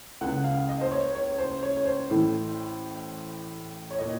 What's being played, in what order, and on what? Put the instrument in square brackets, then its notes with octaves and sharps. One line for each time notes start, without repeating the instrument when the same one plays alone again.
[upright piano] C#2 C#3 F#5
F5
D#5
C5
C#5
C#5
C5
C#5
C#5
C5
A1 A2
C#5
A#2 D#5